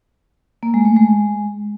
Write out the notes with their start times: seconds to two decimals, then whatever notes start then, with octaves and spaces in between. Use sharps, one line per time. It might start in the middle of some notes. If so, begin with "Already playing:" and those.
0.63 A#3
0.74 G#3
0.85 A3
0.96 G#3